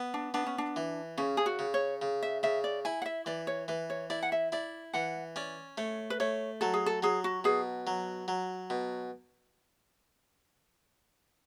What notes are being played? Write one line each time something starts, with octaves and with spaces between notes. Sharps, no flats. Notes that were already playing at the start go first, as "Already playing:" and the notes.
Already playing: B3
D4
B3 D4
C#4
D4
E3
C#3 C#4
G#4
F#4
C#3
C#5
C#3
E5
C#3 E5
D5
E4 G#5
F#5
E5
E3 D5
C#5
E3 B4
C#5
E4 D5
F#5
E5
E4 D5
E3 F#5
C#4 D5
A3 C#5
B4
A3 C#5
F#3 A4
G#4
A4
F#3 G#4
F#4
B2 G#4
F#3
F#3
B2